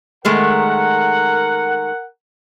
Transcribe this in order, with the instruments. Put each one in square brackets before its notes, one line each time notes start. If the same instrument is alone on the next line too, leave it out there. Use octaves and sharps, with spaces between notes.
[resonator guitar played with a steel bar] D#3 G#3 A3 [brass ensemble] A#4 F#5